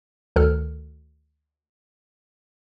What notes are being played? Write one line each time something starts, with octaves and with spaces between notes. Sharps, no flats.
D2 D#3 A4 F6